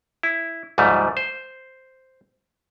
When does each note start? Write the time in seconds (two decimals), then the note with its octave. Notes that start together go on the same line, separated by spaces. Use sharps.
0.23 E4
0.78 D2 G#2 F3 G3 A3
1.17 C5